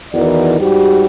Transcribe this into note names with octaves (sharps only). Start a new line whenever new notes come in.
E2 D#3 E3 F#4 A#4 D5
G#2 G3 F#4 G4